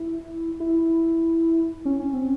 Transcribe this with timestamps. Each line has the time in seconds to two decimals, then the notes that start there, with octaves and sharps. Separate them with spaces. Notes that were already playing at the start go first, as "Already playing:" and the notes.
Already playing: E4
0.60 E4
1.85 C#4
2.00 C#4
2.14 C4